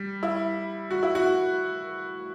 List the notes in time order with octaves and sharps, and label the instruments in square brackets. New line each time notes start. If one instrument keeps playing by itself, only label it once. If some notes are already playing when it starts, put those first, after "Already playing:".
Already playing: [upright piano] G3
E4
F#4
E4
F#4